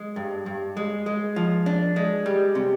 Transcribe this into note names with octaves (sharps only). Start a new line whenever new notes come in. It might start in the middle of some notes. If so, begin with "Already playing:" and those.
Already playing: G#3
G2
G2
G#3
G#3
F3
D4
G#3
G3
C3